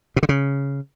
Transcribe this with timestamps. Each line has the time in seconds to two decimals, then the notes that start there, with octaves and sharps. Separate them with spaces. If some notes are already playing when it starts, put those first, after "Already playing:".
0.16 B2
0.23 D3
0.29 C#3